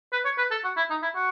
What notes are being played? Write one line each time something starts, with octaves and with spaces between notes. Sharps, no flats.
B4
C#5
B4
A4
F#4
E4
D#4
E4
F#4